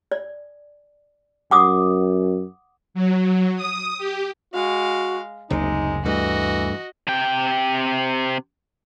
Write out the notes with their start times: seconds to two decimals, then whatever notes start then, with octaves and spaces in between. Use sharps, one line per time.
0.12 D5
1.51 F#2 F#5 D6 D#6
2.94 F#3
3.56 D#6
3.98 G4
4.54 G#3 F#4 F5
5.50 F#1 D2 C3 G#3 D#4
6.05 G2 E3 A3 F#4 D#5
7.07 C3 G5